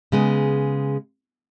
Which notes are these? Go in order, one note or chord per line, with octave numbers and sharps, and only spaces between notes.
C#3 G#3 B3